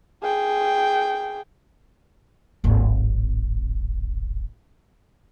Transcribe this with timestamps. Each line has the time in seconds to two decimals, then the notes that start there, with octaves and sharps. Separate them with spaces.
0.23 G#4 G5
2.64 D1 G#1